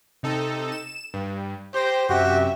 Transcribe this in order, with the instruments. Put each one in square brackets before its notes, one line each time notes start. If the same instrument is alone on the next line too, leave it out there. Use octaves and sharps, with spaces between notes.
[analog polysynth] C3 D#4 A4
E7
G2
[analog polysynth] G4 A#6 [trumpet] C5 [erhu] G6
[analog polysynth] F#2 C3 [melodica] F#4 [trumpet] G4 [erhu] E5